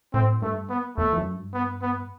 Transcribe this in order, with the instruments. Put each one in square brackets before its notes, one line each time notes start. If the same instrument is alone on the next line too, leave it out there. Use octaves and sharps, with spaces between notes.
[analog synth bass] A2 [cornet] C4
[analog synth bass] G2 [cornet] A3
[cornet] B3
[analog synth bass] E2 [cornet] A3
[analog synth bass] E2
F#2
G2
[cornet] B3
B3